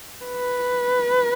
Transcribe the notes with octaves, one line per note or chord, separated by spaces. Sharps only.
B4